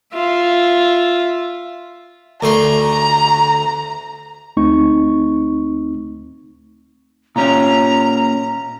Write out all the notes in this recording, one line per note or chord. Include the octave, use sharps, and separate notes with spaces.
F4 E5
D2 A3 A#5 C6
D2 A3 C4 D#4 C#6
A#2 C#4 A#5